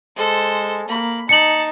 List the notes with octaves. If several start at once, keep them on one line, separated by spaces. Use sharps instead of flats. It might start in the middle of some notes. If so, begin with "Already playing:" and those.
G#3 A4 C5
A#3 B5
D#4 A5 C#7 F#7